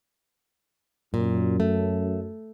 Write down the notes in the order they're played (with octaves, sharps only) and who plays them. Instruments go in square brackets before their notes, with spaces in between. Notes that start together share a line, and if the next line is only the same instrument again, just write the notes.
[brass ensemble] F#2 [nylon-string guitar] A#2
[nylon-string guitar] A3